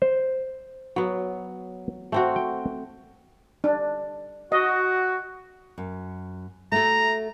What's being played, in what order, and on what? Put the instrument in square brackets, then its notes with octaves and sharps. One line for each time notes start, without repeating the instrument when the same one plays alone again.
[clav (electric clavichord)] C5
[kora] F#3 B3
A3 C4 F#4
[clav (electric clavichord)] G5
[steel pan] D4
[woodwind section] F#4 [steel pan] D#5
[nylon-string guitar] F#2
[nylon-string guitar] A3 F#4 A4 [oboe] A#5